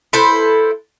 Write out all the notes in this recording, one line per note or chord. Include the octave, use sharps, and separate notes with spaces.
E4 A4 B4 C5